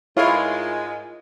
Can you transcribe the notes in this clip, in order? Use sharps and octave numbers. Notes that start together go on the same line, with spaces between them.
G#2 G#3 E4 F4 G#4 A#4 C#5 F5